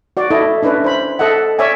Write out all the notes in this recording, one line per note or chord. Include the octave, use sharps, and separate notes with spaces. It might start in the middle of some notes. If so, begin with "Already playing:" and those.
F#4 D5
E4 A4 D#5
C#4 D4 E4 B4
C5 B5
A4 D#5 E5 F#5
C#5 D5 E5 G#5